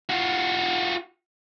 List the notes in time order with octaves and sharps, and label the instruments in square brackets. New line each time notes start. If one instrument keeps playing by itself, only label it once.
[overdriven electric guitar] F4 F#4